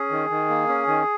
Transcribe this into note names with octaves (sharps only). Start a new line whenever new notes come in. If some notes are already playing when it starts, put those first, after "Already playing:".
Already playing: C#4 G#4
D#3
D#3
A#3
C#4
D#3